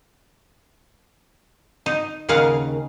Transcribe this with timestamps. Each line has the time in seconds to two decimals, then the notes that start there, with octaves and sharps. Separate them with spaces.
1.86 D#4
2.29 D#2 C#3 G#4 A#4 F5 F#5